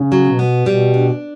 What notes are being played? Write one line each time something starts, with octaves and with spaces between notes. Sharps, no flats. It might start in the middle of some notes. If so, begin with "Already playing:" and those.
Already playing: C#3
F#3
B2
B3
B2 G3
D4